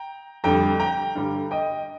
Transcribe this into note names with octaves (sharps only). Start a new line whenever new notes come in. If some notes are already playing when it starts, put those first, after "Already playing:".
Already playing: G5 A#5
F2 D3 G3 G5 A#5
G5 A#5
G2 D3 G3
D#5 G5